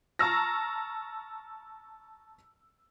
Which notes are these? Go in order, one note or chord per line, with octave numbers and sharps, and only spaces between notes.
A5 A#5 C#6 E6 F6 A#6